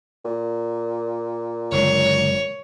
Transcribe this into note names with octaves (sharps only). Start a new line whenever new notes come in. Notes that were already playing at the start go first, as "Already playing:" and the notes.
A#2
F#1 D3 G#3 C#5